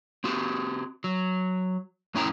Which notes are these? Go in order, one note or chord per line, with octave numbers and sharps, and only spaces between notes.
C4 F#4 G4
F#3
F2 A2 C#4 E4 G5 A#5